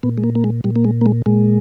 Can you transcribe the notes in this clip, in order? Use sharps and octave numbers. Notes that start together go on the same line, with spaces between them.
A#2 B3
G#3
A#3
A#3
G#3
A#2 G3
A#3
G#3
A#3
G#3
A#2 G#3